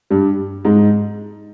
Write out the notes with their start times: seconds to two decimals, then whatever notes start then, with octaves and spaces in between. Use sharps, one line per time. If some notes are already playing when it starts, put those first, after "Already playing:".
0.10 G2 G3
0.65 G#2 G#3